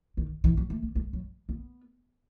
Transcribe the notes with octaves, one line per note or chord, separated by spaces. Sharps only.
D#3
E3
F#3
A3
B3
G#3
F#3
B3